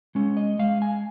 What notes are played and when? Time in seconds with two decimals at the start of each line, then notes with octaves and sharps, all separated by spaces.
0.15 G#3 C#4
0.37 D#5
0.59 G#3 F5
0.82 G#5